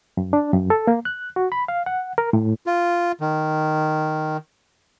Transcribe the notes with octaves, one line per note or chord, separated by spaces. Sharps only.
F#2
D4
F#2
A4
A#3
F#6
F#4
B5
F5
F#5
A#4
A2
F4
D#3